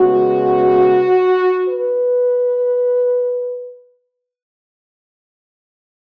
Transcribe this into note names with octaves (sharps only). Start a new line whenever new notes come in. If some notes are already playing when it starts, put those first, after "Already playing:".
Already playing: C#3 G#3 B3 F#4
B4